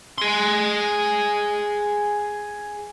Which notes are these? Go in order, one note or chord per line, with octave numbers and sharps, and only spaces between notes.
G#4 C6